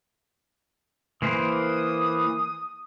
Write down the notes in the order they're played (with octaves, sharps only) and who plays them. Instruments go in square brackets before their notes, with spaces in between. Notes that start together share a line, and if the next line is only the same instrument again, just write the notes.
[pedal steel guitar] E3 A#3 C5 [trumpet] D#6